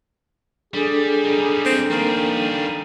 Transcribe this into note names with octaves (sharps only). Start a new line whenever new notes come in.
G3 D4 G#4 A4
G3 D#4
C4
D#3 G3 A#3 G#4